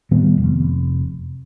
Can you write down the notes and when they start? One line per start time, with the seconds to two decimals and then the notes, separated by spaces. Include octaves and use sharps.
0.11 A2 D#3 G3 B3
0.38 F1